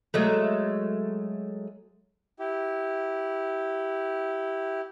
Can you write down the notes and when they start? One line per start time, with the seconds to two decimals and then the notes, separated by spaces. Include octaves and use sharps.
0.14 F#3 G#3 A3
2.40 E4 G4